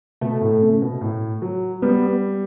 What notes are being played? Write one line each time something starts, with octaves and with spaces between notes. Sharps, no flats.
B2 A3
A2
C#3
B2
A2
F#3
G3 B3